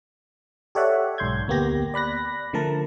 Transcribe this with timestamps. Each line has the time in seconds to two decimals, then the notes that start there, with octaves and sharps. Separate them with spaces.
0.75 G4 A4 C#5 D5 E5 F#5
1.18 B1 G#2 C6 G6 G#6
1.48 D2 A#3 B3 G4 A#6
1.94 D5 B5 F#6 A#6
2.53 D3 F3 A3 A#4 A5